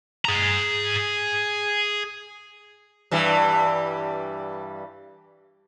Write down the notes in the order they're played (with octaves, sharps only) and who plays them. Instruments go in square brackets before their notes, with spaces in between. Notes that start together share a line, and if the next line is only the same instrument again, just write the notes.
[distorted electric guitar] G#4 A#5
[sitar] G2 E3 G3